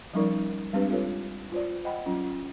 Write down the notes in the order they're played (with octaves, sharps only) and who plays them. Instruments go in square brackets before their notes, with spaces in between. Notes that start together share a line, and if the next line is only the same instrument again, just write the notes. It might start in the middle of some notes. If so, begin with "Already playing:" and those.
[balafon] F3 G3 C#4 D#4 A#4 D5
G3 G#3 C4 D4 G4 B4
C4 F4 A4 B4 C#5
F4 C5 D5
C5 D#5 F#5 G5 B5
F#3 C#4 F4